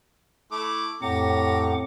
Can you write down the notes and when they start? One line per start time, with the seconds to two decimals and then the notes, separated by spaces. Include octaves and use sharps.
0.52 A3 E4 D6
1.02 F2 A2 G4 F#5 A#5 D6